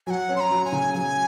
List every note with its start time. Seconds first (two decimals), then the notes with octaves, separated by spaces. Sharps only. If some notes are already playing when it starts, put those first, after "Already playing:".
0.07 F#3 G#5
0.10 F#5
0.29 C#4
0.36 C6
0.40 A#5
0.51 F#3
0.65 G#5
0.72 C#3
0.94 F#3 G#5